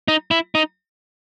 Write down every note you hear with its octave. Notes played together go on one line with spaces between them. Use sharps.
D#4
E4
D#4